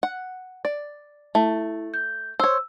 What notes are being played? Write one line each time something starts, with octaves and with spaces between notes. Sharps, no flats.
F#5
D5
A3 E4
G6
C5 C#5 E6